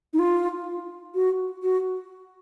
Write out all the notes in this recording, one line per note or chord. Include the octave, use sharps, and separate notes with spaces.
D#4
F4
F#4
F#4